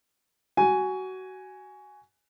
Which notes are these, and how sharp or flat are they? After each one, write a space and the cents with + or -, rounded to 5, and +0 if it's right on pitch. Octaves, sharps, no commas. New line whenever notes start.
F#4 +20 G#5 +0